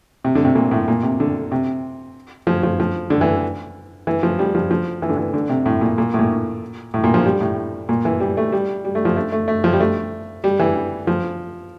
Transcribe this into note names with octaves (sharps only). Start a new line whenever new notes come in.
C3
D3
C3
A#2
A2
A#2
C3
D3
C3
F3
F3
F3
D3
E3
E3
F3
G3
F3
F3
E3
D3
E3
D3
C3
A2
A#2
A#2
A2
A#2
A2
A#2
F3
G3
A2
A#2
E3
G3
A3
G3
G3
A3
F3
A3
A3
A3
F3
G3
A3
G3
E3
F3